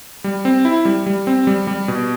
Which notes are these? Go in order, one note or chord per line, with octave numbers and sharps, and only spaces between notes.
G3
C4
E4
G3
G3
C4
G3
G3
B2